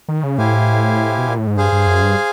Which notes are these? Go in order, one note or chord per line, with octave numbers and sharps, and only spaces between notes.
D#3
C#3
A2 E4 G4 C5 F5 G#5
B2
A#2
A2
G#2
G2 G#4 C5 F5 G#5
G2
F#2
G2